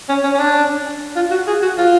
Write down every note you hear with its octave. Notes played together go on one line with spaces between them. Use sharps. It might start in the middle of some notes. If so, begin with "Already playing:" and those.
C#4
C#4
C#4
D4
F4
F#4
G#4
F#4
F4